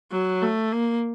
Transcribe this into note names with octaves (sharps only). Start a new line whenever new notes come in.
F#3
A3
A#3